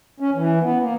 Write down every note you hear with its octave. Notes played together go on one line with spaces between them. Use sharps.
C#4
E3
B3
A#3